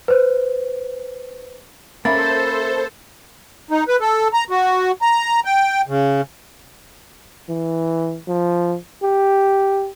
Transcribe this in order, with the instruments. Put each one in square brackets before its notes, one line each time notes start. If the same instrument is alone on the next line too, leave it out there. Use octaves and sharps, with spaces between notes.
[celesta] B4 C5
[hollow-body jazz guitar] A#3 [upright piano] C#4 E5 B5 [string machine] A4 C5 [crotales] A6
[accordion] D#4
B4
A4
A#5
F#4
A#5
G5
C#3
[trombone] E3
F3
G4